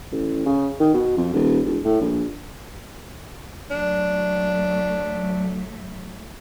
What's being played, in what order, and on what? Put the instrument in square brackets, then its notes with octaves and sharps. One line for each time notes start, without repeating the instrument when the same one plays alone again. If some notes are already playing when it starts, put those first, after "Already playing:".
[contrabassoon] A1
C#3
D#3
B2
F2
D#1
E1
A2
A#1
[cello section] F#3 A3 [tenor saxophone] D4